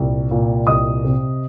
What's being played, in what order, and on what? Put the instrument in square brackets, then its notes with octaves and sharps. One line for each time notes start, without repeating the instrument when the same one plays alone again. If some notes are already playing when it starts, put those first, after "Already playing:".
Already playing: [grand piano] C2 A#2
A#2
C2 D#5 D#6
C3